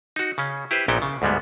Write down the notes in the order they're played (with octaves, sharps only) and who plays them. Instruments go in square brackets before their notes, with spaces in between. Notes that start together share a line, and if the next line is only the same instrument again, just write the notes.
[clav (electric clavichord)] D#4 F#4
C#3 C#4
E4 G4 B4 C5
A#1 A#2 B3 D#4 E4 G5
C#3
D2 G#2 G3 G#3 B3